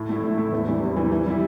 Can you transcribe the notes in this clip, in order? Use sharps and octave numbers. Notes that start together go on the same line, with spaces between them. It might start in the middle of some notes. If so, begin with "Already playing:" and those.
Already playing: A2
A3 E4
A2
A3 E4
E2
C3 E3 G3 E4
E2
C3 E3 G3 E4
E3
G3 E4